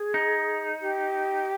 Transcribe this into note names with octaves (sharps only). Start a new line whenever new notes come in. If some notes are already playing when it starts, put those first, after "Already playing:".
Already playing: G#4
D#4
G4